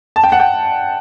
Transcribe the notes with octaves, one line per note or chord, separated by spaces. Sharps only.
A5
G5
F#5
G5